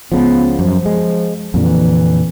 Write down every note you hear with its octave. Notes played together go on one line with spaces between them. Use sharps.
C#2 C#3 F3 B3
F#2 F3
G#3
F2 A#2 D3 E3